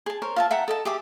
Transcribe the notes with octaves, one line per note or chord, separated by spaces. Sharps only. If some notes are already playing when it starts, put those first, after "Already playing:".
G#4 A5
A#4 C5 C#5
F4 E5 A5
E5 F#5 G5 A#5
A4 D#5 A5
G4 G#4 E5 D6